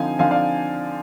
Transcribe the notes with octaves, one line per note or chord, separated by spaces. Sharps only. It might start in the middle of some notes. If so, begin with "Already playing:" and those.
Already playing: D3 F3 C4 D#4 F5 G#5
D3 F3 C4 D#4 F5 G#5
D5 F5